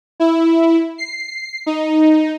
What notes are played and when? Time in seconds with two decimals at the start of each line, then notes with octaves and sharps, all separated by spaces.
0.20 E4
0.98 C7
1.66 D#4